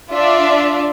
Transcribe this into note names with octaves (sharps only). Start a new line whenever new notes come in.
D4 F4 D5 E5